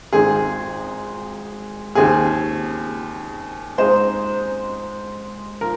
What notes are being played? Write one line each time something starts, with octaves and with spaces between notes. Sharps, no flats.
G#1 G#2 D#3 C4 G#4
D#2 D#3 C4 G#4
G#2 G#3 C4 D#4 C5
F3 A#4